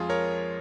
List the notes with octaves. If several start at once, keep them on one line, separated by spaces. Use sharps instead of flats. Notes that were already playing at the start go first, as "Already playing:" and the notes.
Already playing: F2 F3 G#3 F4 G#4
A#4 C#5